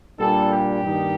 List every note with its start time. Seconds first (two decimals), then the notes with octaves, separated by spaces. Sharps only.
0.19 A#2 G3 D4 A4
0.51 G4
0.82 G2 D#3 G3 A#3 D#4